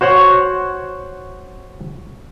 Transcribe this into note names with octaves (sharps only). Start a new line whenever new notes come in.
F#4 C5 C#5 F#5